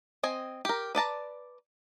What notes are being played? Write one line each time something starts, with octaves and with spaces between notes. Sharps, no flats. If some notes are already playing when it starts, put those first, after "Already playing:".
C4 D#5 G#5
G4 A#4
B4 D5 A5 A#5